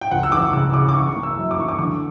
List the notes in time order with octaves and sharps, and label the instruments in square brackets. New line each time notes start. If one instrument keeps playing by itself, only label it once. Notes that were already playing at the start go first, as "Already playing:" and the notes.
[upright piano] G5
C#2 F#5
E6
E3 D6
C#3 E6
C#3 D6
D6
E3 C#6
A#3
E6
F#2
D6
E3 C#6
D6
D3 D6